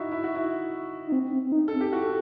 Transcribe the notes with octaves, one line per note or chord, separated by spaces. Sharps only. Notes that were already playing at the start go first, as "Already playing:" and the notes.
Already playing: D#4 E4 F#4
E4
F#4
E4
D#4
C4
C4
C4
D#4
C4 A4
G4
E4 F#4
A4